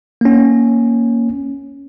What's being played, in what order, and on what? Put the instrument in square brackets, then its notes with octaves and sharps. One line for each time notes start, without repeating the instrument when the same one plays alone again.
[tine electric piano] A#3 C#4